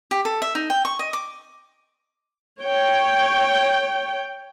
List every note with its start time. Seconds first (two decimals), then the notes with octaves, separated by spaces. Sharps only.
0.11 G4
0.25 A4
0.42 E5
0.55 D#4
0.70 G5
0.85 C#6
0.99 D#5
1.13 D6
2.60 C#5 G5